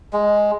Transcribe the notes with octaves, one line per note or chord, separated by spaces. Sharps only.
G#3